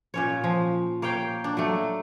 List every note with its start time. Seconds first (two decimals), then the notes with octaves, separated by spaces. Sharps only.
0.14 A#2 C#4 C#5
0.44 F3
1.02 A#3 C#5 F5 G5
1.44 D4
1.57 F#3 A3